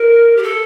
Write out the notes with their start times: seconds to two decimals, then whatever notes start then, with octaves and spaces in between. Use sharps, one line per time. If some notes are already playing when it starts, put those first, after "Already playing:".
Already playing: A#4
0.36 G4
0.43 A4